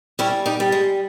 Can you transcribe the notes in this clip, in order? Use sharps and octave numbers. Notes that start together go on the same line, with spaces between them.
G3 C#4 E4
D#4 G4
G3
G#3